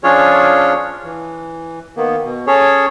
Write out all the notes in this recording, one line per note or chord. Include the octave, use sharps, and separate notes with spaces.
F3 C#4 D4 F4 G#4 C#5
E3
D#3 A#3 B3
B2
C#4 G#4 A4 C#5